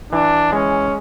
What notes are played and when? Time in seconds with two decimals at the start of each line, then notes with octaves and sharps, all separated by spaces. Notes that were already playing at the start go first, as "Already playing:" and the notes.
0.12 E3 D4
0.52 G#3 C#4